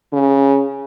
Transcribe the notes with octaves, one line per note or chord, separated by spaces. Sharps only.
C#3